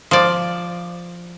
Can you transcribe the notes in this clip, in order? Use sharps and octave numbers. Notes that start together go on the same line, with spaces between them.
F3 D5